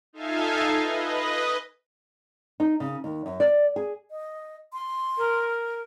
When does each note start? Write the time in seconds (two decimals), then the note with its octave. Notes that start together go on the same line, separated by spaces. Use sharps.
0.13 D#4 F4 A4 E5 F5 G#5
0.77 B4 D#5
2.60 D#4
2.80 C#3
3.04 D#2
3.26 F#2
3.40 D5
3.76 G#4
4.09 D#5
4.73 C6
5.17 A#4